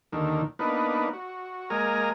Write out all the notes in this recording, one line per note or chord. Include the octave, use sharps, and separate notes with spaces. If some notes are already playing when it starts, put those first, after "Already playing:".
D#2 D3 D#3
A#3 B3 D4 D#4 B4
F#4
G#3 A#3 A#4 G#5 A#5